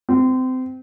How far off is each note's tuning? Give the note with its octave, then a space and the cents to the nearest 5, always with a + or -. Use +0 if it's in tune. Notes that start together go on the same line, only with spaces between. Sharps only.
C4 -25